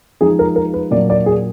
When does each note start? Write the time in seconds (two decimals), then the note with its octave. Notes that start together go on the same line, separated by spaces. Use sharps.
0.21 F3 G#3 D#4 G#4
0.39 A#4
0.56 A#4
0.74 B4
0.91 A#2 F#3 A#3 D4 D5
1.10 D5
1.26 G#4